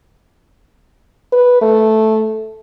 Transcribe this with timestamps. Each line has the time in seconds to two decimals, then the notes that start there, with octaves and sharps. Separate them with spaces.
1.32 B4
1.62 A3